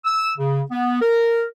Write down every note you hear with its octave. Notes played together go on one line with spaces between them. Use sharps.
E6
C#3
B3
A#4